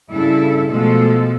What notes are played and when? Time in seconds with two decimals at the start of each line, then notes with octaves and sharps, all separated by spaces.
0.10 G2 C#3 E4 A4
0.71 B2 F3 G#3 A3 A4